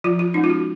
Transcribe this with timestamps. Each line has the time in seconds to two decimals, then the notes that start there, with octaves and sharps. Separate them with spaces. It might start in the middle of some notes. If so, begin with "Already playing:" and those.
0.04 F3 F4
0.19 F4
0.34 G#3 C#4 D#4
0.44 F4
0.49 F#4